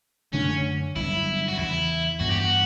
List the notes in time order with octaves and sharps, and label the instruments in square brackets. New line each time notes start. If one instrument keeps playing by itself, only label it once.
[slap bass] F#2 D3 A3 D4 [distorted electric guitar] C#4
[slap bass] G1 G2 F#3 [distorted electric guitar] E4
[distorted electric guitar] F#4
[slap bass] E2 C#3 E3 [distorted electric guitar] E4
[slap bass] G2 E3 B3 [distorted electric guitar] F#4
[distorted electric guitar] G4
F#4